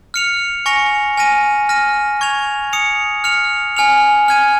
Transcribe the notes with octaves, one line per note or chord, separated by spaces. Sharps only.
F6 C#7 F7
G#5 C#6 A#6 C#7 F7
G#5 F6 A#6 D#7
F6 A#6 D#7
C#6 G#6 F7
D#6 C#7 F7
F6 C#7 F7
G#5 F6 C#7 F7
F6 G#6 D#7